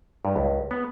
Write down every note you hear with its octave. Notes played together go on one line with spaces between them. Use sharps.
G2
C#2
B3